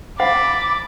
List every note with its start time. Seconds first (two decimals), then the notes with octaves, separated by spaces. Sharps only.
0.20 C5 F5 F#5 B5 D6 A6